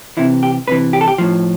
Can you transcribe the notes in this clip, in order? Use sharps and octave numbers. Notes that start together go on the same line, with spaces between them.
C3 E3 E4
G4
C3 E3 B4
G4
A4
G4
A2 F3